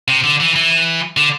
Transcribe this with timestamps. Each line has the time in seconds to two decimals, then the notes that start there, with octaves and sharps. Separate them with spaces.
0.08 C3
0.24 D3
0.40 E3
0.55 E3
1.17 D3